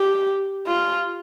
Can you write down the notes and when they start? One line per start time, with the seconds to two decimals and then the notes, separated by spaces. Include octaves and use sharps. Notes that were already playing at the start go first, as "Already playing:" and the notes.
Already playing: G4
0.67 F4